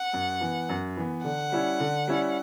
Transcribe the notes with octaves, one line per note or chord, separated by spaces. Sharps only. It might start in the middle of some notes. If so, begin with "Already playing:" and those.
Already playing: F#5
F#2
E3 B3
F#2
E3 B3
D3 F#5
G3 C#4 E4
D3
G3 C#4 E4